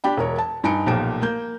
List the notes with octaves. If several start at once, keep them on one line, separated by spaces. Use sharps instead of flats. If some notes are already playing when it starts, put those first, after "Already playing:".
D4 G4 G5 B5
E1 A#4 C#5
A5
G2 D#4 G#5 B5 C#7 D7
B1 A#2 F3 A#3 G4 D7
A#3 G6